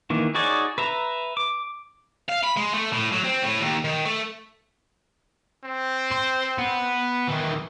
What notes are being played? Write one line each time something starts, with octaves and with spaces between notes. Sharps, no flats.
D#3 E3 A#3
D#4 F#4 G#4 C#5 D5
B4 E5 A#5
D6
F5
B5
G#3
A3
A2
F#3
C4
A2
D#2
D#3
A3
C4
C5
B3
D#3 E3